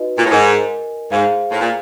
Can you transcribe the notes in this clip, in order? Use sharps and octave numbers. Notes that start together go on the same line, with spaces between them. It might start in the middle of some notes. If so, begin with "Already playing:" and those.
Already playing: D#4 F#4 B4 D#5
A#2
A2
G#2 A#4 D#5 G#5
G#2 G#4 C5 F5
A2
A#2